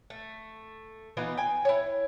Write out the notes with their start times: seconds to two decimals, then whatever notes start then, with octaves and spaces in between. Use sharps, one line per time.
0.10 A3
1.17 E3 B3 D#4 F4
1.37 G5 G#5
1.65 E4 C#5